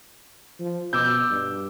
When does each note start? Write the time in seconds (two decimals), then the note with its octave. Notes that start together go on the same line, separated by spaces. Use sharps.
0.60 F3
0.93 B2 D6 E6 G6
1.30 G2